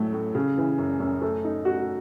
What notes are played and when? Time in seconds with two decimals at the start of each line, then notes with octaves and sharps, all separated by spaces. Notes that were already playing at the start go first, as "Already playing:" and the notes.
Already playing: A2 F#3 A3
0.13 A2
0.35 C#3
0.58 E3
0.78 F#2
1.00 F#2
1.22 A3
1.45 D#4
1.65 F#4